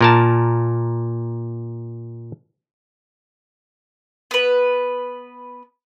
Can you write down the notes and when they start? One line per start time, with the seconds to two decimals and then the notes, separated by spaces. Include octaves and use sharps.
0.01 A#2 A#4 A5
4.31 B3 B4